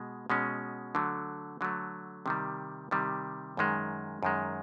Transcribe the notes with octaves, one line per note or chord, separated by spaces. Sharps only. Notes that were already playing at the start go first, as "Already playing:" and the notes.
Already playing: B2 G#3
B2 G#3 C#4
D3 F#3 A3
D3 F#3 A3
C3 D#3 G3
C3 D#3 G3
F#2 D#3 G#3
F#2 D#3 G#3